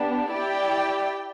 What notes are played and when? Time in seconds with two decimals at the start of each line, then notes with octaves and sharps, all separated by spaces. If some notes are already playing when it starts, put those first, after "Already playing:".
Already playing: B3 D4 G4
0.30 E4 G4 D5 G5